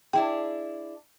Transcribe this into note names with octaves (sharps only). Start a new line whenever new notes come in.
D4 E4 G#4 G5